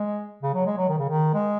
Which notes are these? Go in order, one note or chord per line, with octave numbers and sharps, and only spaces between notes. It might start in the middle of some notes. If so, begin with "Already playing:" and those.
Already playing: G#3
C#3
F#3
G#3
F#3
D#3
C#3
D#3
G#3